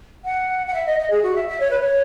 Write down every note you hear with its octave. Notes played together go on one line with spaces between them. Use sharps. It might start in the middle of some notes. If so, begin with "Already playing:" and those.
F#5
F#5
E5
D#5
D#5
G#4
F#4
E5
E5
C#5
B4
C#5